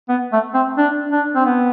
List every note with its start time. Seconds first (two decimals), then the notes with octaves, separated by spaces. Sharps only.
0.09 B3
0.32 A3
0.54 C4
0.77 D4
1.11 D4
1.35 C4
1.45 B3